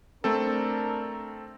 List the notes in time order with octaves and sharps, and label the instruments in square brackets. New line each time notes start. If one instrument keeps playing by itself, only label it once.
[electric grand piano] A3 C4 A4 [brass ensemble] D4 A#4